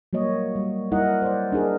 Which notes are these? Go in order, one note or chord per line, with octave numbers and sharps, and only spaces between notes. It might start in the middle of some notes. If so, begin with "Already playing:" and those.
F#3 G3 A#3 C#5 D#5
G3
G3 D#4 E4 A#4 D#5 F#5
C5 D5
D4 D#4 G#4 A#4